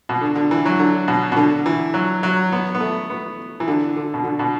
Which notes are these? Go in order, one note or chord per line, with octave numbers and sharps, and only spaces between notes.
B2
D3
D3
E3
F#3
D3
B2
B2
D3
E3
F#3
F#3
B3
B3
A3
B3
E3
D3
D3
B2
D3
B2